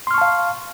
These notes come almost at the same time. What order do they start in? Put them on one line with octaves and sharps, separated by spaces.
C6 F6 C#6 A5 F5